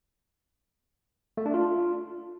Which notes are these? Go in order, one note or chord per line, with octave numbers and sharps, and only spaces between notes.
A3
D4
F4